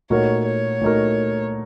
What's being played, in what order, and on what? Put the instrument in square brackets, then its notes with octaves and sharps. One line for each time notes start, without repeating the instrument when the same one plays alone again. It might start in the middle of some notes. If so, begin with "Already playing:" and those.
[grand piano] A#2 A3 D#4 F#4 A#4 [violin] C#5
[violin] C#5
[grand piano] A#2 A3 D#4 F#4 A#4